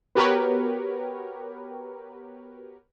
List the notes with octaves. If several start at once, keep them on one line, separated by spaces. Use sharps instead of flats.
B3 F#4 G4 A#4 B4 C#5